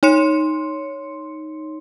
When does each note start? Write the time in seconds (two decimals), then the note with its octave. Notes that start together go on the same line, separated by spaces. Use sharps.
0.03 D#4 C#5 C6 C#7